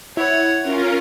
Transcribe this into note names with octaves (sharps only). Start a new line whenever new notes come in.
E4 C#5 F#5
C#4 F4 A#4